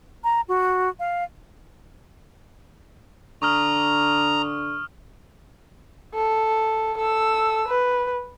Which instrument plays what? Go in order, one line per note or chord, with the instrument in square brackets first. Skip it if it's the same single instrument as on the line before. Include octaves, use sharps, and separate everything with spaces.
[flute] A#5
F#4
F5
[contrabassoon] D3 [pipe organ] A#5 [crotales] C#6 D#6 F6
[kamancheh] A4
A4 E6
B4